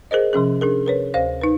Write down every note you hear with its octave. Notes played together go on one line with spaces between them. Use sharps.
G#4 A#4 C5 D#5
C3 F3 C#4 G#4
D4 G#4 A#4
A#4 B4 C#5
D2 C5 F5 A#6
D#4 B4